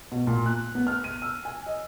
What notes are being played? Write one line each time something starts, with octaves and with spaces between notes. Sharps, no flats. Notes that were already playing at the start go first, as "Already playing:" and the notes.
B2
A#2
F#6
B3
F6
D#7
E6
G#5
D#5